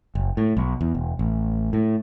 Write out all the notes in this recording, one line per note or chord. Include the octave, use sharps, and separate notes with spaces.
F#1
A2
B1
E2
E1
A1
A2